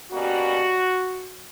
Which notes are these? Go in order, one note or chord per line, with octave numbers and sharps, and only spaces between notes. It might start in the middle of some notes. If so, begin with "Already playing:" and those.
B2 G3 A#3 C#4 F#4